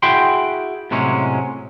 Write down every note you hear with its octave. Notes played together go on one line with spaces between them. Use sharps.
E4 F#4 G#4 G5 B5 C6
A2 C3 F#3 G#3 C#4